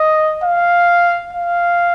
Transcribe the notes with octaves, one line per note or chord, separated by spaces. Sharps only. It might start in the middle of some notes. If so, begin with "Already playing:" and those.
Already playing: D#5
F5
F5